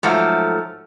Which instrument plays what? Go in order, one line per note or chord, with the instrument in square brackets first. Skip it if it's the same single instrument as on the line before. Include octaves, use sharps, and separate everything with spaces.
[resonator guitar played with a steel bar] G#2 F3 F#3 A3